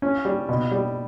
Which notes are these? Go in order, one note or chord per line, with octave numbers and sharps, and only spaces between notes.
C#4
G3
B2
G3